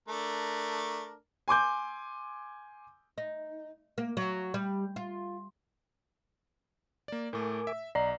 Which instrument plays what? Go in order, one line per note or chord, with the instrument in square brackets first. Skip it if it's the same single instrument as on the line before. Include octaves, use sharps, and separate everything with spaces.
[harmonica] A3 D4 A#4
[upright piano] G#5 C6 D6 G6
[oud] D#4
A#3
F#3
G3
F4
[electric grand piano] A#3 D5
[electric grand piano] A2 A3 [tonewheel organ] A#4 G#5 D6
[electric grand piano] E5
[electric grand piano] B1 C7 [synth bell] D5 A#5 [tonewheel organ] D#5